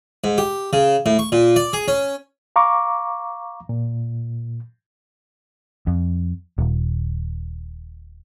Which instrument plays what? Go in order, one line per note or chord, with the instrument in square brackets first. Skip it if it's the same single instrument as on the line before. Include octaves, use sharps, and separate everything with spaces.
[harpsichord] G#2
G4
C#3
A2
C#6
A#2
D5
G#4
C#4
[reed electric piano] F5 A#5 C#6 D6
A#2
[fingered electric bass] F2
D#1